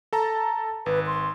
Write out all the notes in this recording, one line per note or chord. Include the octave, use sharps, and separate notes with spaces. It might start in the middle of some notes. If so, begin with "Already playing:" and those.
A4 A5 A#5
G#1 B4
C6